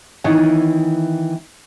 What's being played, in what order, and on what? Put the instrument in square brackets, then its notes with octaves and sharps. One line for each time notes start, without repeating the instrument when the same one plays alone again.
[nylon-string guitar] D#3 E3 B3 C#5 G#5